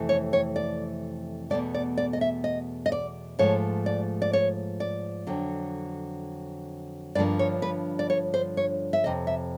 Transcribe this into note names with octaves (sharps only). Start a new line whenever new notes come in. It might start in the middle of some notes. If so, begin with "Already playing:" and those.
Already playing: F2 C3 E3 A3
C#5
C#5
D5
E2 B2 F#3 A3 D5
D5
D5
D#5
E5
D#5
D#5
D5
G#2 F3 A3 C#5
D5
D5
C#5
D5
F2 D3 F#3
G2 D3 F3 A#3 D5
C#5
B4
D5
C#5
C5
C#5
E5
F2 C3 D#5
E5